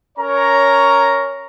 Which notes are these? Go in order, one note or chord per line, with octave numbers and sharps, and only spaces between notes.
C#4 A#4 C#5 A#5